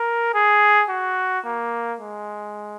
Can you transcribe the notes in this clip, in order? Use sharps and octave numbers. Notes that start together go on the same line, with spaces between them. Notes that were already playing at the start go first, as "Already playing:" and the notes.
Already playing: A#4
G#4
F#4
A#3
G#3